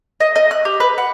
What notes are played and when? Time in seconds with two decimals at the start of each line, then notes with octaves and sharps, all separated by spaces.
0.20 D#5
0.36 D#5
0.51 F#6
0.65 G4
0.80 B4
0.98 F#5